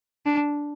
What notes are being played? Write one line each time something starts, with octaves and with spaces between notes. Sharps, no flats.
D4